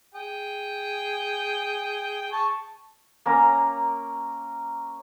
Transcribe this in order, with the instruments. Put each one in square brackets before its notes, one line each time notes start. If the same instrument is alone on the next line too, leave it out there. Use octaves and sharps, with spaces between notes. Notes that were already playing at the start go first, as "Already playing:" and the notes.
[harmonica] G#4 G5
G#4 A5 C#6
[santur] A#3 C#4 A#5